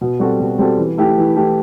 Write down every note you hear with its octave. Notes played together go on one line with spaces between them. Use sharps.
B2
G3 C4 F#4 A4
B2
G3 C4 F#4 A4
E3
A3 E4 G4
E3
A3 E4 G4